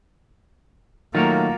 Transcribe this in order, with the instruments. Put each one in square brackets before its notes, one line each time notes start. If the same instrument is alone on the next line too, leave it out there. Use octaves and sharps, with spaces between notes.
[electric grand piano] D#3 F#3 A3 [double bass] A#3 [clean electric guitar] F4 F#4 A#4